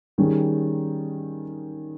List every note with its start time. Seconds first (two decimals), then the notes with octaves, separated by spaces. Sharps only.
0.18 D#3 G3 C#4 G#4